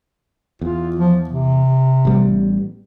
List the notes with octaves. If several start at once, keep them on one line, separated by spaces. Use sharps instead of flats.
E2 F4
F3
C3
A1 G3 B3